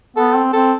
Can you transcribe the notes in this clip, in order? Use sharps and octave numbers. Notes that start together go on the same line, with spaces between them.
B3 A4
C4
C4 A4